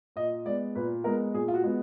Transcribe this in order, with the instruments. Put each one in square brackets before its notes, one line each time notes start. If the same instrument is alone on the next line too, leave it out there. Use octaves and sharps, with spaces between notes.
[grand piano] A#2 D#5
G#3 B3 D5
A#2 B4
G#3 B3 A#4
A#2 G#4
F4
F#4
G#3 B3